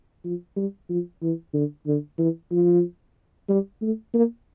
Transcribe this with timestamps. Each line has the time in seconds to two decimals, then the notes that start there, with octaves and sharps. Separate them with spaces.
0.24 F3
0.56 G3
0.89 F3
1.22 E3
1.53 D3
1.86 D3
2.18 E3
2.51 F3
3.49 G3
3.82 A3
4.14 A#3